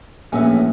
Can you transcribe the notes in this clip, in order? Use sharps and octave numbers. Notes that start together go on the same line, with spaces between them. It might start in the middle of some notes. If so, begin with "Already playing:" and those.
A#1 A2 E3 C#4